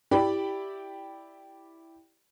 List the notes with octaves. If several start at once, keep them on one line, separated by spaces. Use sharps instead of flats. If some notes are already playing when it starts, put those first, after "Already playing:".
E4 G4 D5 G5 B5